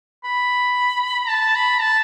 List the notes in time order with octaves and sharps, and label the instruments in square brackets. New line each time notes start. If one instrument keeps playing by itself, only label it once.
[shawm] B5
A5
B5
A5